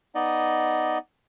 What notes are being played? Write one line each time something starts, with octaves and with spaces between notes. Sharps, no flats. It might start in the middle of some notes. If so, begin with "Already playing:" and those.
B3 D#4 D5 D#5